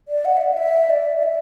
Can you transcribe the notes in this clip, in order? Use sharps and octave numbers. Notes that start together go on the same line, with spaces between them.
D5
F#5
E5
D5
F#5
E5
D5
D5
E5